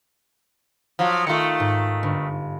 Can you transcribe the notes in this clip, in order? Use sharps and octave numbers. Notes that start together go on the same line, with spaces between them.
F3 F#3
D#3 A3 F4 C#7
G#2
G1